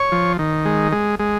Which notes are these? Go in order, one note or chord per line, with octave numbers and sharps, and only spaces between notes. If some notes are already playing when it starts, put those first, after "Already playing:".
Already playing: C#5
F3
D#3
G#3
G#3
G#3